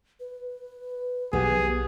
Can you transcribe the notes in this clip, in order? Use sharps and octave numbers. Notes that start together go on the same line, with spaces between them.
B4
B1 B3 G4 G#4